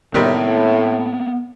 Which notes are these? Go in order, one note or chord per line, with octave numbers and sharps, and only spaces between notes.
A2 C3 D#3 G3 B3 C4